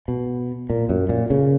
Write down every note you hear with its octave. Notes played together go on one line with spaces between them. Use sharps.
B2
A#2
F#2
A#2
C#3